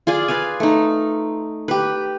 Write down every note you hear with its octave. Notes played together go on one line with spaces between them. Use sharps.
F4 G#4 D5 G#5
B4 D5 F5 G#5
A3 D#4
G4 B4